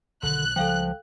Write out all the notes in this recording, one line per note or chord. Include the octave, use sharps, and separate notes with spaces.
B1 D3 D#3 F#6
C#2 C#3 F3 G3 A4 F5 G5